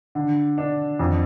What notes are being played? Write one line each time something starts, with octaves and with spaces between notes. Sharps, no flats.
D3
D4
F2